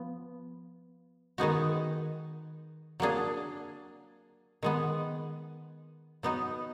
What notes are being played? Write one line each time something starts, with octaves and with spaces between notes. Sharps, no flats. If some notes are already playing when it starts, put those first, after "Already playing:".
Already playing: F3 B3
D#3 G#3 B3 D#4 F#4
F#3 A#3 D4 G#4
D#3 G#3 B3
F#3 B3 D#4